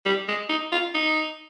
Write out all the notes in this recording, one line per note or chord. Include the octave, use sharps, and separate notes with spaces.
G3
G#3
D#4
F4
D#4